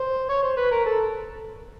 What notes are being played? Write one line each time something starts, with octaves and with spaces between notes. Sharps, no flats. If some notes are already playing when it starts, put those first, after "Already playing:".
Already playing: C5
C#5
C5
B4
A#4
A4